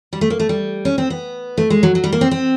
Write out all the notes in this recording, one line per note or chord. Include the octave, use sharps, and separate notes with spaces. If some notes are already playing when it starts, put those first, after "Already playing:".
G3
A3
A#3
A3
G3
C#4
C4
B3
A3
G#3
F#3
F#3
G3
A#3
C4
C4